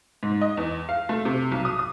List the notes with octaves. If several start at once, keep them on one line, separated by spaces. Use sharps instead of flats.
G#2
D#5
E2
F5
A3
C3
B1
D#6
D#6